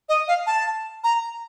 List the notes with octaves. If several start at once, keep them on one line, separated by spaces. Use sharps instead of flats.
D#5
F5
A5
A#5